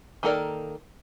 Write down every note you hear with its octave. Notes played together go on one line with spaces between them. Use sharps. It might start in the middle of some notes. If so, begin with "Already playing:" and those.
D#3 A#3 A4 A#4 D5